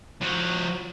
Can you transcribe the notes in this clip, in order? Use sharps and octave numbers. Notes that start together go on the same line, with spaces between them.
F3 F#4